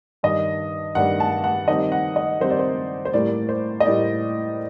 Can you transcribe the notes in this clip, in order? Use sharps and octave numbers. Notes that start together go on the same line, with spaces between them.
G2 D#3 G3 D4 D#5
G2 D#3 G3 D4 F#5
A5
F#5
D#3 G3 C4 D#4 D#5
F#5
D#5
D#3 G3 C4 D#4 C5
D5
C5
C5
A2 G3 A#3 D5
C5
D#5
A2 G3 A#3 D5